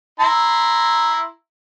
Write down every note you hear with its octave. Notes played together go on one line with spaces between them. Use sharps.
E4 A#5 C6